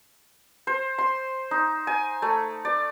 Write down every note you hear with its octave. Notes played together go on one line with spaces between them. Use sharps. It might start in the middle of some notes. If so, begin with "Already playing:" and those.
C5
C6
D#4
G#5
A3
D5